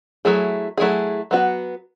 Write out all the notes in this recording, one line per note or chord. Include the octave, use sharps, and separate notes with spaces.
F#3 A3 E4 G#4
F#3 A3 E4 G#4
F#3 B3 F#4